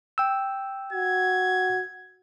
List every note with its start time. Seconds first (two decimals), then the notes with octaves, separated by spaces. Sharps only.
0.18 G5 E6
0.93 F#4 G#6